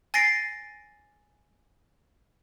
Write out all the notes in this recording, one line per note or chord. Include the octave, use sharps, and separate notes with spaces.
G#5 A6 A#6 C7 D7